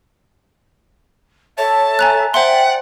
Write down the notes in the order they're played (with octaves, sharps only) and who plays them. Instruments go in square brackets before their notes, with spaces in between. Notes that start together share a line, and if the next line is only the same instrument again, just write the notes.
[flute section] A4 E5 [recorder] C#5 [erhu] A5
[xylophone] G#5 A#5 F#6
[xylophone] C5 C6 [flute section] D5 G5 [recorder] E5 [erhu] F#5